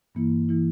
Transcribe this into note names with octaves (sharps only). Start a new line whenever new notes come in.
G2 E3 A#3 E4
E3 A#3 E4